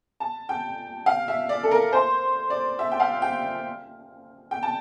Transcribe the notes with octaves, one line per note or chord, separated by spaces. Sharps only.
A5
G5
F5
E5
D5
A4
A#4
C5
D5
E5
G5
F5
G5
G5
A5